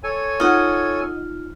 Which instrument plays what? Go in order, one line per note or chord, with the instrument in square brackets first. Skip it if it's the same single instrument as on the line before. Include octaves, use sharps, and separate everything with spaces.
[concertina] A4 C#5 G#5
[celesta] D#4 F4 F6 [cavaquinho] D#5 F#5